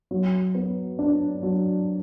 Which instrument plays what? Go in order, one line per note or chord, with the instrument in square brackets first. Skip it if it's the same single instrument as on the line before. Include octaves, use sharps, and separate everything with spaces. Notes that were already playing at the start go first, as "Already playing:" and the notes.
[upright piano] F#3
B3
D4
F#3